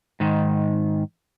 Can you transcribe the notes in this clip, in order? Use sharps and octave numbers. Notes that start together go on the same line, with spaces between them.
G#2 D#3